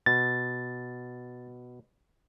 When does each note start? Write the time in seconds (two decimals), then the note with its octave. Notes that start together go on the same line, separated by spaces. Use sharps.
0.06 B2 A6